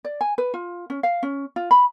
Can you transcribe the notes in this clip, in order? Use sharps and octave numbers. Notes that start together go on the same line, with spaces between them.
D5
G#5
B4
F4
C#4
F5
C#4
F4
B5